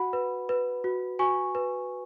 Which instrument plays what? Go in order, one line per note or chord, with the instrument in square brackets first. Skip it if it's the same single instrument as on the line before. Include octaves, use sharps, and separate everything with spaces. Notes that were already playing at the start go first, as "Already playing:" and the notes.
Already playing: [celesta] F#4 F#5 B5
B4
B4
F#4
F#4 G#5 C#6
B4